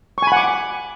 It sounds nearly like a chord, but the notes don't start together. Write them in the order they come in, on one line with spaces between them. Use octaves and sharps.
C#6 G#5 B5 F#5 D6